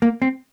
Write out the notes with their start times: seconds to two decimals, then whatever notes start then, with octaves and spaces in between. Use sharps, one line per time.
0.02 A#3
0.22 C4